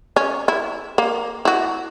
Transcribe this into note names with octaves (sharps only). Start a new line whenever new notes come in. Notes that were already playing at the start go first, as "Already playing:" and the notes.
C#4
E4
A#3
E4 F#4